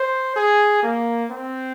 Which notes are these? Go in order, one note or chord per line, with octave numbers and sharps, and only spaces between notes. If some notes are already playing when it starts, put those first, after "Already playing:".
Already playing: C5
G#4
A#3
C4